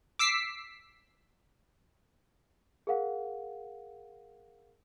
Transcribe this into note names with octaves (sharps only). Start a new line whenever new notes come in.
D6 E6 B6 C7
G#4 A#4 F5 F#5